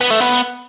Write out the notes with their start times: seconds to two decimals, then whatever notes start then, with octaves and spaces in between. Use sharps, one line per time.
0.01 B3
0.11 A3
0.20 B3